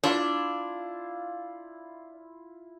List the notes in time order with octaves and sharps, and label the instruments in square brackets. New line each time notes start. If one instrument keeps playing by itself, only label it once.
[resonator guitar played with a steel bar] D4 [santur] E4 F4